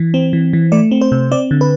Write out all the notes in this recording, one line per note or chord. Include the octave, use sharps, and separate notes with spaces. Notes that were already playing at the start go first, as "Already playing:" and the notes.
Already playing: E3
C4
E3
E3
A3 D5
C4
C5
C3
C4 D5
D3
B4